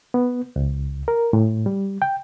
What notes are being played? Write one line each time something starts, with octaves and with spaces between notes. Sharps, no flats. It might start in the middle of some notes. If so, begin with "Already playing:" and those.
B3
C#2
A#4
A2
G3
G5